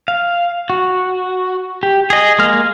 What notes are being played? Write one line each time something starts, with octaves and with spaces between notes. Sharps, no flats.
F5
F#4
G4
G#4 D#5
G#3 A#3 F6